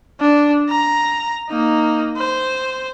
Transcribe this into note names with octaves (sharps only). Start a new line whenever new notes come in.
D4
A#5
A#3 D#4
C5